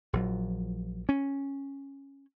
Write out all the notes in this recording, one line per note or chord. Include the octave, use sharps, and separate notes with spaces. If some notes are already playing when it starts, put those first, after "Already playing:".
A#1 F3 F#3
C#4